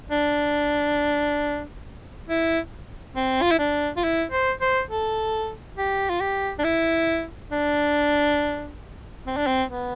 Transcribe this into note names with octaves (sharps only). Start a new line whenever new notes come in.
D4
E4
C4
F4
E4
D4
F4
E4
C5
C5
A4
G4
F4
G4
D4
E4
D4
C4
D4
C4
B3